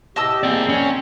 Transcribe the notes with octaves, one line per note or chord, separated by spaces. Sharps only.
A2 C3 G4 D#5 A5 E6
A#3 C4 G#4 D5
C#4